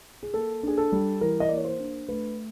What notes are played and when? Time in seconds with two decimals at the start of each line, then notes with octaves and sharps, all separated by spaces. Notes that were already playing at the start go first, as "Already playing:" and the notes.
0.23 G#4
0.34 A#3 A4
0.63 D4 G#4
0.77 A4
0.92 G3
1.21 E3 A#4
1.40 D#5
1.49 A#3 D5
1.57 C#5
1.65 C5
1.80 D4
2.08 A3 B4